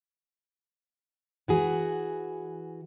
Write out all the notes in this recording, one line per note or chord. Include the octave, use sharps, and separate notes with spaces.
E3 F#4 G#4